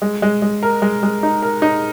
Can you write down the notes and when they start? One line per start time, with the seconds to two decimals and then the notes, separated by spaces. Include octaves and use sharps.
0.02 G#3
0.22 G#3
0.42 G#3
0.63 A#4
0.82 G#3
1.03 G#3
1.23 D#4
1.42 A#4
1.62 D#4